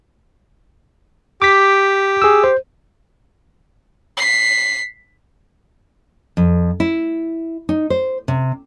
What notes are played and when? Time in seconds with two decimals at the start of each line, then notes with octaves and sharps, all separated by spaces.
1.42 G4 D6 B6
2.22 G#4 E6
2.44 C5
4.17 B6 C7
6.37 F2
6.80 E4
7.69 D#4
7.90 C5
8.28 C3